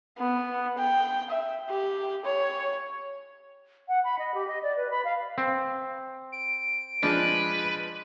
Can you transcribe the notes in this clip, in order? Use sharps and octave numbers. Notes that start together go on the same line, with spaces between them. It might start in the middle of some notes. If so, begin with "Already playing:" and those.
B3
G5
E5
G4
C#5
F#5
B5
D#5
G4
D#5
D5
B4
B5
F5
C4
D7
F3 G#3 D4 B4